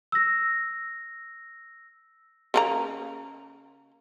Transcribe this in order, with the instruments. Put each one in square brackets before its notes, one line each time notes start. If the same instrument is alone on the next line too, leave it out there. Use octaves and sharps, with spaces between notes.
[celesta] E6 A#6
[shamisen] C#3 A#3 A#5